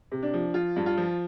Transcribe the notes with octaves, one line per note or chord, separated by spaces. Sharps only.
C3
D4
F3
F3 F4
G2
F4
F3